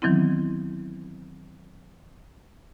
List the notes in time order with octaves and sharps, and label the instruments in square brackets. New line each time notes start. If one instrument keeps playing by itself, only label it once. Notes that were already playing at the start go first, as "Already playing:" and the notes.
[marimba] D#3 E3 F#3 B3 C4 E4